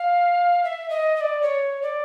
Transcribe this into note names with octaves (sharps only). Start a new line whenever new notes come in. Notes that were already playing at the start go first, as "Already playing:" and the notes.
Already playing: F5
E5
D#5
D#5
D5
C#5
D5